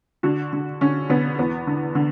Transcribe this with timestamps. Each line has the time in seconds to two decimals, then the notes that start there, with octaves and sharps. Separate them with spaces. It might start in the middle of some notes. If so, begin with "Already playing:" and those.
0.23 D3 F#4
0.53 D3
0.81 D3 C#4
1.09 D3 B3
1.39 E2 B3
1.67 D3
1.95 D3